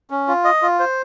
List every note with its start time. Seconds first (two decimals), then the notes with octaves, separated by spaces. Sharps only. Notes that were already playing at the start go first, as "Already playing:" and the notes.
0.10 C#4
0.28 F4
0.44 D#5
0.62 F4
0.79 C5